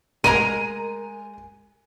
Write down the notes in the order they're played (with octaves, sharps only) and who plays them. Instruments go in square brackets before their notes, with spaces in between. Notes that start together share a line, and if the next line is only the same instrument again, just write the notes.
[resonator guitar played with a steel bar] G#3 G#5 A#5 [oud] A#4 [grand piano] D#7